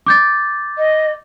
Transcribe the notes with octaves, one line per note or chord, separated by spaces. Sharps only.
D6 G6 A6
D#5